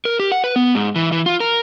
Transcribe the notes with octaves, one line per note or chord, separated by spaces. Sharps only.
A#4
G4
F#5
B4
B3
G#2
E3
E3
F4
A#4